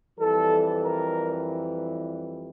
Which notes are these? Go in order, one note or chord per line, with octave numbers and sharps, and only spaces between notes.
F2 E3 G3 A4
A#4